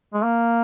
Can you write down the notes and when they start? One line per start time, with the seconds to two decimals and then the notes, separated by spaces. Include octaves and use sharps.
0.14 G#3
0.23 A#3